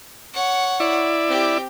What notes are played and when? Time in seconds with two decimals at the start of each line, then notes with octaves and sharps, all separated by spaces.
0.34 C#5 F#5
0.80 E4 D5
1.27 C4 G4